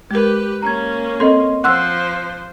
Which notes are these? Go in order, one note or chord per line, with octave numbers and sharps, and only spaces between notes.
G#3 G4 A#4 B4
A#3 C#4 A#5 G#6
C4 A4 D#5 C6
F3 C5 F#5 C6 E6 F#6